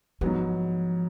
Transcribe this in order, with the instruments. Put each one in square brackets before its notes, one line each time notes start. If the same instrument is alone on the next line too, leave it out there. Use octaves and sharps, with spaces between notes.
[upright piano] G#2 F#3 B3 [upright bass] F3